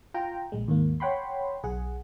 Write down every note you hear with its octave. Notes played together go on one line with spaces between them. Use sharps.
F4 G5 A#5
A#1 G#3
D#2 G#2 A#3
C#5 F#5 G5 B5 C6
B1 G#4 F#5